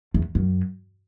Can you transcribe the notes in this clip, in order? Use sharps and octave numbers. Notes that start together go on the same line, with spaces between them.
E2
F#2